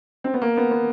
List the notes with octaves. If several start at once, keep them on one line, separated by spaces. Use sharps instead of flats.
C4
B3
A#3
B3
B3